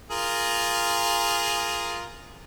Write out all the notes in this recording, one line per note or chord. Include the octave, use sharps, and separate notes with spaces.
F4 G#4 A#4